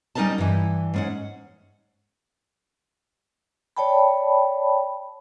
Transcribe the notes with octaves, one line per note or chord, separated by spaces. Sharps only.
G3 C#4 D#4 A#4 D#5 A5
G2 E3
G#2 C#4 F#5
C#5 D5 G5 A5 B5